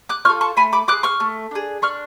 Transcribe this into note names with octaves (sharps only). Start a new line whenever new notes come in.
D6 F#6
F4 A4 C#6 F6
A5 C#6
A3 G#5 B5
B5 D6
F4 D6 F#6
G#4
C#6 F6
A3
D4 G#4
D4 C#6 F6